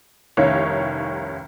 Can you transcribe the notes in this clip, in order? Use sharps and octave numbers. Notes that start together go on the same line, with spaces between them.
F1 C2 D#3 C#4 C#5 F5